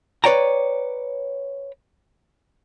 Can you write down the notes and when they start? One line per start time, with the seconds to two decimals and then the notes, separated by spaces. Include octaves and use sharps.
0.24 B4 C#5 D5 G5 A#5